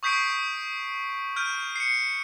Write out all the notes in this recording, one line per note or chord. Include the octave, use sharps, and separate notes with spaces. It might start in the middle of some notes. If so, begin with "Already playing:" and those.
C#6 D#6 G6 B6 C7 D7
F6 G6 D7 D#7
C7 C#7